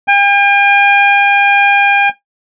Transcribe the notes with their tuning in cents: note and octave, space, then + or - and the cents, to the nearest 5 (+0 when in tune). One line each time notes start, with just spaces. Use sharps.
G5 +45